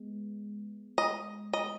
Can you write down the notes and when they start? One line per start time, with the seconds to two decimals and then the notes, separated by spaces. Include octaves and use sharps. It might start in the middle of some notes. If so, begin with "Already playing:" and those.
Already playing: G#3 B3
0.98 D#5
1.53 D#5